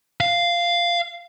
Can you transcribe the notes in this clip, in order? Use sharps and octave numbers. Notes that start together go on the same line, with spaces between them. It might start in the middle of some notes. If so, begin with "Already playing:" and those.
F5